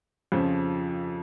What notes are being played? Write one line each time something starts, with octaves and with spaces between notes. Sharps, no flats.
F2 C#3 F3